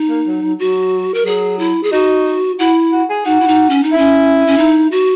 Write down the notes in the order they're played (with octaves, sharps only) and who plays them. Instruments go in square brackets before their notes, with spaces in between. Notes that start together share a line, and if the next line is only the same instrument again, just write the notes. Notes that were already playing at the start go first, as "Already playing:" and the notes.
Already playing: [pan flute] D#4
[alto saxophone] A#3
F#3
F#3
[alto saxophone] F#3 [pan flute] F#4
[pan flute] A#4
[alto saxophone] F#3 [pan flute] G#4
[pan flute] E4
G#4
[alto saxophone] D#4 [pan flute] F#4
[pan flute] E4 [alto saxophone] F#4
[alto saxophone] F#4
G#4
[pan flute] D#4 [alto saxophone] F#4
[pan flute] E4
D#4
C#4
D#4
[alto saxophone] E4
[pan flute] C#4
C#4
D#4
F#4